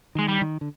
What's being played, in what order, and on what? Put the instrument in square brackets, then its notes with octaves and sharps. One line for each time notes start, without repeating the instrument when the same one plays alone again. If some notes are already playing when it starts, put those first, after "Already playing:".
[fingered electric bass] D#3 [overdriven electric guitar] G#3
[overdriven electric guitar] G3
[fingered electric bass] D#3
D3